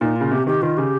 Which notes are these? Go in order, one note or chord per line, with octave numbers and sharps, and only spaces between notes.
A#2 D#4
C#3 F4
C3 G4
D#3 G4
D#3 F4
C#3 G4